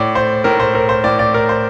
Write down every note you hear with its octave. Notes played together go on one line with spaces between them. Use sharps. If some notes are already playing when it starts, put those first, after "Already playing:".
Already playing: A2 D5
C5
A2 A#4
C5
A#4
C5
A2 D5
D5
A#4
C5